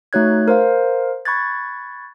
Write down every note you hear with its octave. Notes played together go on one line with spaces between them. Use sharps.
A3 D#4 F#4 C#5 F#6 G#6
A#4 C5 F5
B5 C#6 F#6 G#6 A6